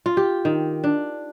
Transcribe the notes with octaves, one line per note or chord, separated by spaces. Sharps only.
F4
G4
D#3
D4